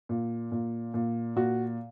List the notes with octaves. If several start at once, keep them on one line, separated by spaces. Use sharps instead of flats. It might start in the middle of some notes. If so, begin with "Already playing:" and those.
A#2
A#2
A#2
A#2 F#4